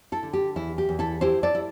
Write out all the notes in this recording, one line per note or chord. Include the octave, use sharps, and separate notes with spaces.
E4 A4
D3
G4
E2 E4
G4
E2
E4 A4
E4 G4 C5
A4 D5
E4